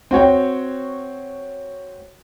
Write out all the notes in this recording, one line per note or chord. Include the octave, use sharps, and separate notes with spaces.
C4 F#4 C#5 G5